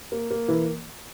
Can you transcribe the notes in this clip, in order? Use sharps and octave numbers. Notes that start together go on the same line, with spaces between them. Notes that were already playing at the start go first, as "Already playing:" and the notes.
A#3
A#3
E3